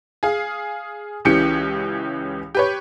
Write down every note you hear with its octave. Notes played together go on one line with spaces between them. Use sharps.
G#4 F5
C#2 E3 C#4 G4 C#7
G4 B4 C#5